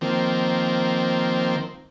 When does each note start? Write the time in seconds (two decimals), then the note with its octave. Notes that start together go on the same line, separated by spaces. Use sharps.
0.01 D#3 F3 A#3 C4